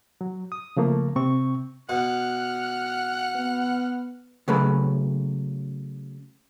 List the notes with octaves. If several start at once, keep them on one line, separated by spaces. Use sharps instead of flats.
F#3
D#6
C#3 F3 A3 A#3
C3 C4 C#6
B2 F#5 F6 F#6
B3
C#3 F#3 A3 B4 A5 B5